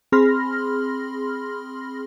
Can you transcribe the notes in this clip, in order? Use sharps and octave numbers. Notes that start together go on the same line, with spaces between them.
C4 G#4 B5 C6 F6 A#6